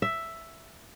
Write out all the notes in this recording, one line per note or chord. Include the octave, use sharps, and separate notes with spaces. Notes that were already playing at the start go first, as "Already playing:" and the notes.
E5